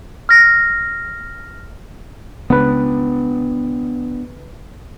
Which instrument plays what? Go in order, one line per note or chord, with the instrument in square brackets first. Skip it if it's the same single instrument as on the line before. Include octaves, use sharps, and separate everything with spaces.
[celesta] F6 A#6
[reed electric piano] C#2 B4 [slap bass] B3 D4